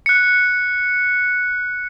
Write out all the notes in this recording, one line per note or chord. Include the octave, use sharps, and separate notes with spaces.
F#6 C#7